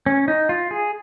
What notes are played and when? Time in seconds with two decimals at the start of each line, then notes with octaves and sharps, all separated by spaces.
0.06 C#4
0.28 D#4
0.49 F4
0.71 G#4